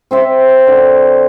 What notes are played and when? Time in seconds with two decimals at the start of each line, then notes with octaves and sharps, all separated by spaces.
0.11 C4 C5 E5
0.67 D3